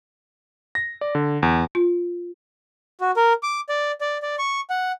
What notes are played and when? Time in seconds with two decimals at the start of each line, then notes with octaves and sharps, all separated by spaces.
0.75 A#6
1.01 D5
1.15 D3
1.43 E2
1.75 F4
3.01 F#4
3.16 A#4
3.43 D6
3.69 D5
4.01 D5
4.22 D5
4.39 C#6
4.70 F#5